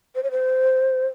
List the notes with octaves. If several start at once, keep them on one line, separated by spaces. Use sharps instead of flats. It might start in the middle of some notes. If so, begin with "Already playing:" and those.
C5
C#5
C5